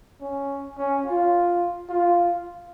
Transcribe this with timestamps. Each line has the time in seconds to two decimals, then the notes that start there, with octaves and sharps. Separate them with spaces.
0.21 C#4
0.78 C#4
1.06 F4
1.89 F4